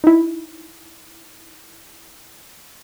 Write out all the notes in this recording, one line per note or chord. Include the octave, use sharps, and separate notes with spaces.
D#4 E4